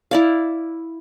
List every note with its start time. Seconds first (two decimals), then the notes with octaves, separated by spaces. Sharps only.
0.11 E4 D5 F5